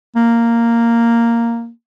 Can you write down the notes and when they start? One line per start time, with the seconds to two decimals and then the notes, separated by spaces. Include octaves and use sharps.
0.16 A#3